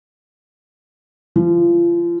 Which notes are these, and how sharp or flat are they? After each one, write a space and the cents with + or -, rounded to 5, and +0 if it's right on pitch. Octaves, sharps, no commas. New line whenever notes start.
F3 -30